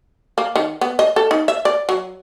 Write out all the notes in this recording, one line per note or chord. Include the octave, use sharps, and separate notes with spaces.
A#3
D#3
B3
D#5
A4
D#4
E5
D5
F#3